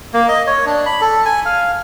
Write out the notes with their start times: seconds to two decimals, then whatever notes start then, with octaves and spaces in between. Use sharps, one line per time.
0.14 A#3
0.29 D#5
0.47 C#5
0.66 D4
0.86 B5
1.01 A4
1.26 G#5
1.45 F5